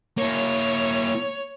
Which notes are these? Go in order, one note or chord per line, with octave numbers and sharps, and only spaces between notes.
A#3 E4 C#5